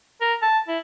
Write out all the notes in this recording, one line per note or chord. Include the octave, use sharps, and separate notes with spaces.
A#4
A5
E4